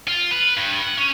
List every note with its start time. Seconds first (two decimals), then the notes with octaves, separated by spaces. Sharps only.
0.08 F4
0.31 B4
0.57 G2
0.82 F#5
0.98 C#4